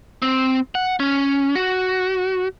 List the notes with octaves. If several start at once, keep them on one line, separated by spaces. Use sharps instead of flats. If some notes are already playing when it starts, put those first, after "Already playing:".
C4
F#5
C#4
F#4